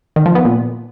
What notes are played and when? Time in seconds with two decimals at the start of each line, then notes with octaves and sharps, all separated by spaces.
0.16 D#3
0.26 F3
0.35 B3
0.45 A#2